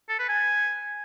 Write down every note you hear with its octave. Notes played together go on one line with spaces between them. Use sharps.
A4
B4
G#5